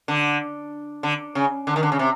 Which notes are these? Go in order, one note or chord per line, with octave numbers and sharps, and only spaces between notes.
D3
D3
C#3
D3
D#3
D3
C#3
C3